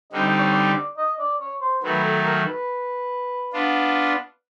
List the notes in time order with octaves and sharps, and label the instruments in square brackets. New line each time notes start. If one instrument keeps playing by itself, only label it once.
[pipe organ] D3 G3 C4 D#4 [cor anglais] D#5
[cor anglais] D5
C#5
D5
D#5
D5
C#5
C5
[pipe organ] D#3 F#3 A3 [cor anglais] B4
[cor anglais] A4
A#4
B4
[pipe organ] B3 D4 F4